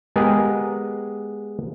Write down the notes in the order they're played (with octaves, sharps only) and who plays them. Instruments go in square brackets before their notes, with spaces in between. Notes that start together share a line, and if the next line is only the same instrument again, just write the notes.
[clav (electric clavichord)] G#3 B3 G4 G#4 A#4